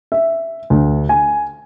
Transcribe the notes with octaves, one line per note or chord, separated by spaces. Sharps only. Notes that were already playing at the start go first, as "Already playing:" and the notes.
E5
D2
G#5